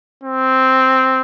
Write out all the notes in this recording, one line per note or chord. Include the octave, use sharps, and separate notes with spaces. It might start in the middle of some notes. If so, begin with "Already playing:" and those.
C4